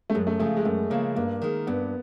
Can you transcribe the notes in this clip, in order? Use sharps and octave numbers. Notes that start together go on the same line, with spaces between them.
A3
F#2 G#3
A3
C#3 F3 A3
G#3
F#2 A3
C#3 F3 A#3
G2 A#3
D#3 G#3
G2 B3